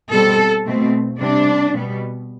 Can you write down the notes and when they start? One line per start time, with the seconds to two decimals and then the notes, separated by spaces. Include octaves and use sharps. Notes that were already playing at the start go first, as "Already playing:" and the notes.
0.11 B2 G3 C4 A4
0.66 B2 A3 C4
1.20 C3 G3 C4 D4
1.74 B2 G3 B3